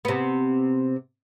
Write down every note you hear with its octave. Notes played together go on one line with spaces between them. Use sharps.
C3 B3